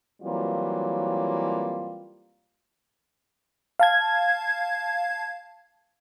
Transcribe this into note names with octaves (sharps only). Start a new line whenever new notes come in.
E3 F#3 G3 A#3 C4 F4
F5 A5 G#6